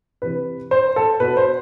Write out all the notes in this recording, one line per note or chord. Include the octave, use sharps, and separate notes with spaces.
C3 E3 B4
C5
A4
B2 B4
C5